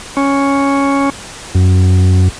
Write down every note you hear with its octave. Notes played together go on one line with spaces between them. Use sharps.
C#4
F#2